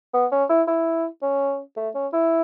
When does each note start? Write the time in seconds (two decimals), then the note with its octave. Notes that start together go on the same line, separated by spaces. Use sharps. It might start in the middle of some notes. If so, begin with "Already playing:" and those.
0.13 B3
0.32 C#4
0.49 E4
0.68 E4
1.22 C#4
1.76 A3
1.94 C#4
2.13 E4